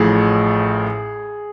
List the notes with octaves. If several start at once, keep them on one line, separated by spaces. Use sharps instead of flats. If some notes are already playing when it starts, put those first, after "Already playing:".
Already playing: A1 A2 F3 G#4